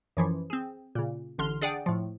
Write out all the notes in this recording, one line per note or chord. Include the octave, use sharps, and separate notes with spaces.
F#2 E3 F3
C4 G#4
A#2 C#3
A1 D3 C6 F6
D4 G#4 D5 F#5 G5
A2 F3